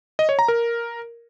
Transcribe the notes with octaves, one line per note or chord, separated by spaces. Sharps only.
D#5
C#5
A#5
A#4